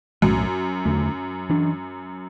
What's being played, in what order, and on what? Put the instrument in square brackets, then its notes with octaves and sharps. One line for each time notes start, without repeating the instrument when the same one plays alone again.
[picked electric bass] B1 A2 F#3 [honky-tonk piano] F#2
[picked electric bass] E2 D3 A3
E3 D4